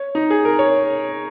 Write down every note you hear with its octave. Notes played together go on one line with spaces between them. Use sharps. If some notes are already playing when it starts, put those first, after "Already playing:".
Already playing: C#5
D#4
G#4
A#4
C#5